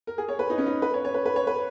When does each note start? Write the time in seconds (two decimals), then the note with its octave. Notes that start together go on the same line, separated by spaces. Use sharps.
0.07 A#4
0.18 G#4
0.28 C#5
0.39 B4
0.50 D#4
0.58 C#4
0.66 D#4
0.82 B4
0.94 C#5
1.05 C#5
1.14 B4
1.26 B4
1.36 C#5
1.47 B4